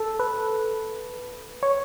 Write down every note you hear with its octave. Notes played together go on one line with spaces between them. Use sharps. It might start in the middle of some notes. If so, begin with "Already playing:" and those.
Already playing: A4
B4
C#5